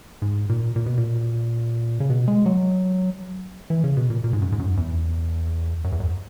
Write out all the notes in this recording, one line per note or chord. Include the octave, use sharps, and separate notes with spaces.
G#2
A#2
A#2
B2
A#2
C#3
B2
G#3
F#3
E3
C#3
B2
A#2
A#2
G#2
F#2
G#2
F#2
E2
F#2
E2
F#2